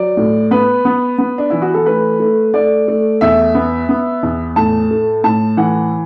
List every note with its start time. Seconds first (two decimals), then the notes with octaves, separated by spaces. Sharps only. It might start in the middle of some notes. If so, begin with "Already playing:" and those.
Already playing: F#3 D5
0.17 A2
0.51 B3 B4
0.85 B3
1.18 B3
1.38 D4
1.50 E3 E4
1.62 F#4
1.74 A4
1.86 A3 B4
2.20 A3
2.54 A3 D5
2.88 A3
3.21 E2 E5
3.55 B3
3.89 B3
4.23 E2
4.56 A2 A5
4.90 A3
5.24 A2 A5
5.57 E3 F#5